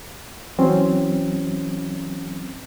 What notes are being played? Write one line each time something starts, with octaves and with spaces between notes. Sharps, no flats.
E3 F#3 C4 C#4